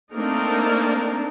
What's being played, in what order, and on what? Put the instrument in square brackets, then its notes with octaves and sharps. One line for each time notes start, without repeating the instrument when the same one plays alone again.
[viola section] A3 A#3 C4 D4 D#4 A#4